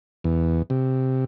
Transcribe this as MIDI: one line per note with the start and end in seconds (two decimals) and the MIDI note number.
0.24 0.63 40
0.70 1.25 48